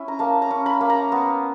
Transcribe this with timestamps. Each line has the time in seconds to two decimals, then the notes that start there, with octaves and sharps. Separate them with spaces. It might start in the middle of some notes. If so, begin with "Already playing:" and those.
Already playing: C#4 E4 G#5
0.08 A#5
0.19 A#3 A5
0.42 A#5
0.50 C#4
0.66 B5
0.81 A#3
0.90 A#5
1.12 B3